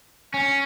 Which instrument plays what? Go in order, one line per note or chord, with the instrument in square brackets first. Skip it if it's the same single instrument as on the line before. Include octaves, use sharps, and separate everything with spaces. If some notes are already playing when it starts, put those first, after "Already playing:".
[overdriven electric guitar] C#4